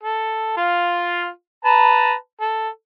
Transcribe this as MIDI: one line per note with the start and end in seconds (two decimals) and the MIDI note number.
0.03 0.53 69
0.57 1.29 65
0.57 1.29 77
1.65 2.14 71
1.65 2.14 81
1.65 2.14 82
2.41 2.69 69